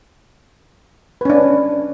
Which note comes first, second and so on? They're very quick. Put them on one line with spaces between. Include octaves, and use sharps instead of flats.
B4 C#4 D4